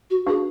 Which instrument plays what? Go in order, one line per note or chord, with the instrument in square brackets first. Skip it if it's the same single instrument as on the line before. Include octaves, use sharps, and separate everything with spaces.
[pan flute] F#4
[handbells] D4 F#4 B4 F5 [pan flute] G#4